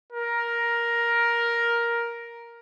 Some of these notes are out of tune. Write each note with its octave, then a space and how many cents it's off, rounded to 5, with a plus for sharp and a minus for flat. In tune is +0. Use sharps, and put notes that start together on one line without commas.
A#4 +10